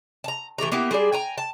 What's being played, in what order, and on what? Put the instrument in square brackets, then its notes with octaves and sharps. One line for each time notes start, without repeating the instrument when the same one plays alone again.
[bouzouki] A5 A#5
E3 A3 G4 A#5
A#3 B3 E4 G4
G3 G#3 G#4 D5
G5 G#5 A#5
A5